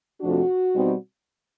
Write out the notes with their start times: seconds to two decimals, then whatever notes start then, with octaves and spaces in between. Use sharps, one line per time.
0.21 F2 C3 F3 A3 D4 F#4
0.75 B2 G3 C4 D#4